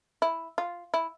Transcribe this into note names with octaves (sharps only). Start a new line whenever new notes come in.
E4
F4
E4